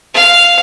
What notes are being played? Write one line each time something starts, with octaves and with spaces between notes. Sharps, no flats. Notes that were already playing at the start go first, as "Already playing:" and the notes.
F5